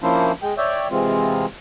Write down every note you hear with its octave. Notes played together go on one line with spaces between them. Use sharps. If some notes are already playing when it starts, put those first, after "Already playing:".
F3 A#3 C#4 D4 E4 C5
G#3 G5
C#5 D5 E5 G5
C3 E3 G#3 C4 F4